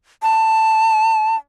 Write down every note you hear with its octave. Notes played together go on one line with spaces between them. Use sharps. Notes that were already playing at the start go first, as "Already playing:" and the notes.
A5